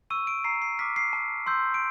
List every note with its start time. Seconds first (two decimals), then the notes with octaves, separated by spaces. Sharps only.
0.10 C#6 E6 D#7
0.27 D7
0.44 A#5 C7
0.62 C7
0.79 D6 F6 B6
0.96 C7
1.13 A5
1.46 C6 E6 G6
1.74 D7